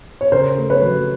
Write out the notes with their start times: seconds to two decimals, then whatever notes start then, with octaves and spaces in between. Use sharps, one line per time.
0.21 C#5
0.32 C#3 A#4 C5
0.58 A3
0.70 B4 C#5
0.82 F#3